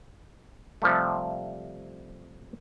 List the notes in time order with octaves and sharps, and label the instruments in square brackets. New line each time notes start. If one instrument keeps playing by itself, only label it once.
[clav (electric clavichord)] C3 F3 G3 A3